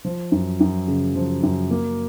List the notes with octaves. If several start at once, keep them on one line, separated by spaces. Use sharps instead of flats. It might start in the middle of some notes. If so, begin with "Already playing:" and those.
F3
F#2
F#2
C#3
F3
F#2
A#3